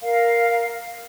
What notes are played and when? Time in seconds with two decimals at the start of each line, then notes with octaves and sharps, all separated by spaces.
0.02 A#4 F5